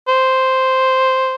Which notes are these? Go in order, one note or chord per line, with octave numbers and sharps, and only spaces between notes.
C5